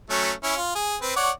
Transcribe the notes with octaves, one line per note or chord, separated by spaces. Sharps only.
F#3 A3 C#4
C#4 E4
F4
G#4
C4 B4
C#5 D5 F#5